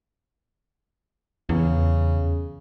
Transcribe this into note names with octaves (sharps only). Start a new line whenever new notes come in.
E2 C#3